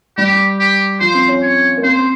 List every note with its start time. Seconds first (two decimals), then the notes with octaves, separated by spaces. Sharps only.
0.17 G3 G4
0.59 G4
1.00 F3 C5
1.14 C4
1.28 C#4
1.42 C#5
1.77 A#3
1.83 C4 C5